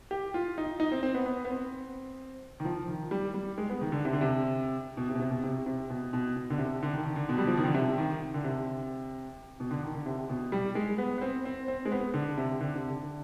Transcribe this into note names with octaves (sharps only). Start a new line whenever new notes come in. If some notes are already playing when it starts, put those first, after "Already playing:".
G4
F4
D#4
D#4
C4
C4
B3
B3
B3
C4
D#3
F3
D#3
G3
G3
G#3
B3
D#3
D3
C3
D3
C3
B2
C3
B2
C3
B2
C3
C3
B2
B2
B2
D3
C3
D3
D#3
D#3
D3
B2
G3
F3
D#3
D3
C3
D#3
D3
C3
B2
D3
D#3
D3
C3
B2
G3
G#3
B3
B3
C4
C4
C4
G#3
B3
D3
C3
D3
C3
D3